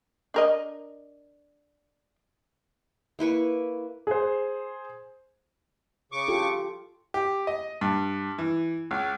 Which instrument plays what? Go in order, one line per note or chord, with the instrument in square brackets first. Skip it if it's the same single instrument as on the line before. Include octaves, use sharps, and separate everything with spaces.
[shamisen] D4 A#4 D#5
[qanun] A#3 E4 B4 C#6
[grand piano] G#4 C5
[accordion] C#3 C#6 D6
[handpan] F4 G4 A4
[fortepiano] G4
D#5
G2
E3
C#2